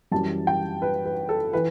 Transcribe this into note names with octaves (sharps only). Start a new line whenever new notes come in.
F#2 E3 G3 A5
G5
B4
B4
A4
E3 B4